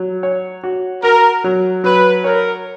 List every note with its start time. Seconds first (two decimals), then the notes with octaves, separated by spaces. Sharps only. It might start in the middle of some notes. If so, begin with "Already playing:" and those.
Already playing: F#3
0.23 C#5
0.64 F#4
1.03 F#4 A#4
1.44 F#3
1.84 F#3 B4
2.24 A#4 C#5